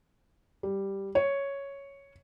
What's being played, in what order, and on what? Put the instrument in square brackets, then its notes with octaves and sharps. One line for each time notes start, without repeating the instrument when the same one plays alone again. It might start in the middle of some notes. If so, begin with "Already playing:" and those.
[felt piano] G3
C#5